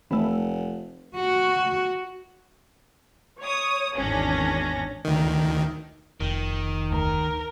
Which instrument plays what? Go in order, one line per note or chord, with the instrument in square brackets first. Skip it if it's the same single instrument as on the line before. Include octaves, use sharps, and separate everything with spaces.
[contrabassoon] F1 [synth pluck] E3 A3
[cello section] F#4
[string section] C#5 D#6
G#1 E2 C#4 D4 A#6
[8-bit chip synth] D2 D#3
[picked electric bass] F1 [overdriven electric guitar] D#3
[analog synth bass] D2 [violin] A#4